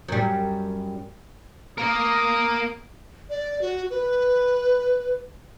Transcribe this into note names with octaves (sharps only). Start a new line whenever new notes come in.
F#2 G3
A#3 A#4 D#6
D5
F#4
B4